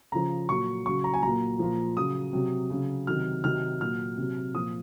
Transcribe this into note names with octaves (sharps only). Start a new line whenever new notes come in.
C#3 F3 A#5
A#2 F#3 C#6
C#3 F#3 C#6
A#5
G#5
A#2 F#3 A#5
A#2 F3
C#3 F#3 D#6
C3 F#3
C#3 F#3
C3 D#3 F#3 F6
C3 D#3 F#3 F6
A#2 F#3 F6
C3 F#3
A#2 F3 D#6